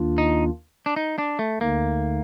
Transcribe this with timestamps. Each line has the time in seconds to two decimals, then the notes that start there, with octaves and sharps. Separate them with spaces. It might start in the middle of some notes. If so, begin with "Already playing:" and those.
Already playing: D#2 D#3 A#3 D4 F4
0.18 D#4
0.86 D4
0.96 D#4
1.18 D4
1.39 A3
1.60 D2 D3 A3 A#3 D#4